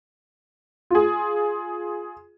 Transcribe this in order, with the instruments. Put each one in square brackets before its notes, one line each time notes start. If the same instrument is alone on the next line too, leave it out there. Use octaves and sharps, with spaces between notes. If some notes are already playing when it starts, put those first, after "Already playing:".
[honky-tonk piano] F4 G#4